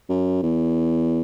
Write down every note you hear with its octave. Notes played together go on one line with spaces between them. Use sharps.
F#2
E2